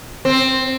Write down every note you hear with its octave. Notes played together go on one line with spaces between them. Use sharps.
C4